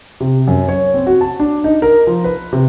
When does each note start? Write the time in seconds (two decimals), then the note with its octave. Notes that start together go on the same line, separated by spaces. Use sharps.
0.20 C3
0.47 F#2
0.69 C#5
0.94 C4
1.07 F#4
1.21 A5
1.40 D4
1.64 D#4
1.82 A#4
2.07 F3
2.24 B4
2.53 C3